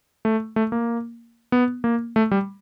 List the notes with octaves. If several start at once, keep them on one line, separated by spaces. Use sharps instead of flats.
A3
A3
A#3
B3
A#3
A3
G3